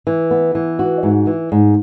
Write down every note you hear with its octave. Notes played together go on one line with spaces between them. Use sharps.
E3
B3
E3
F#4
G#2
E3
G#2